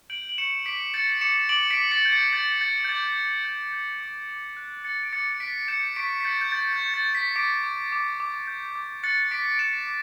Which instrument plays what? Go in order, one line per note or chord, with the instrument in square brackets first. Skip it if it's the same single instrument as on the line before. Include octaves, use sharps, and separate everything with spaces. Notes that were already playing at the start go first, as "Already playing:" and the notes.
[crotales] G6 D7 F#7
F#7
C#6 C#7 E7
D6 B6 D7
G6 A6 C#7
D6 C#7 E7
D6 D7 F#7
B6 D7
D6
A6 C#7
G6
A6 C#7
G6 A6
G6 A6
G6
D6 A6
D6
G6
G6
D6
D6
F#6
F#6 A6 C#7
D7
D6 A6 C#7
F#6 B6 D7
G6 C#7 E7
C#6 B6 D7
B6
G6 A6 C#7
G6
G6 A6
G6
C#6
A6
G6
B6
D6 B6 D7
D6
D6
D6
G6
D6
F#6 A6 C#7
D6 B6 D7
D7
F#6 C#7 E7
D6